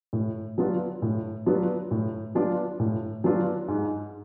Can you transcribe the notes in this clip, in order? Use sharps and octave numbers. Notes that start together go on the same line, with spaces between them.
A2
F#3 B3 D4 F4
A2
F#3 B3 D4 F4
A2
F#3 B3 D4 F4
A2
F#3 B3 D4 F4
G#2